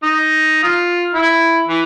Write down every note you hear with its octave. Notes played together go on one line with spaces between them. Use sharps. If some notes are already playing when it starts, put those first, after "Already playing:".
D#4
F4
E4
E3